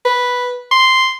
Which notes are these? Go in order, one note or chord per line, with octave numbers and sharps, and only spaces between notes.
B4
C6